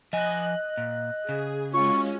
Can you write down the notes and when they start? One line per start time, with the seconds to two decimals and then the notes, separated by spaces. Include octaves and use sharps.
0.13 F3 D#5 G#5 F#6
0.77 A#2
1.29 C#3 G#4
1.74 G#3 C#4 F4 F#4 C#6